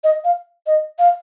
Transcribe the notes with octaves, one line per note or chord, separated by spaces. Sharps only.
D#5
F5
D#5
F5